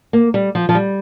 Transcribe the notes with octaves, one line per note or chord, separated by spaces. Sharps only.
A#3
G3
F3
F3
G3